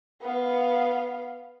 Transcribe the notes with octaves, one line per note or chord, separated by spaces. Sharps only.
B3 F5